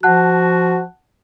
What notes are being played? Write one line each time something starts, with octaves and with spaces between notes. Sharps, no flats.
F3 F#4 F#5 A5 F#6